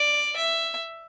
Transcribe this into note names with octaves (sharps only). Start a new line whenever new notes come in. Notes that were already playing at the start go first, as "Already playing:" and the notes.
Already playing: D5
E5